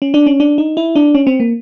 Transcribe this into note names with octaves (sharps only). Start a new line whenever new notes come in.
C#4
D4
C#4
D4
D#4
E4
D4
C#4
C4
A#3